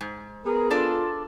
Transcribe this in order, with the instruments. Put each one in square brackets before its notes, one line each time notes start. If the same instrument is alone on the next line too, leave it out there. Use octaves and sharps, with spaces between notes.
[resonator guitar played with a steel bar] G#2
[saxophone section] B3 G#4 [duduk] A#4
[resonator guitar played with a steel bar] D4 A4 D5 [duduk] F4